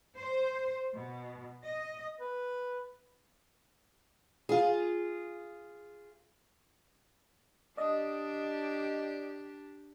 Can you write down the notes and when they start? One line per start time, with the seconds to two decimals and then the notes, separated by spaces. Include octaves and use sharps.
0.18 C5
0.93 B2
1.64 D#5
2.20 B4
4.49 F4 G#4
7.77 D4 G4 D5 D#5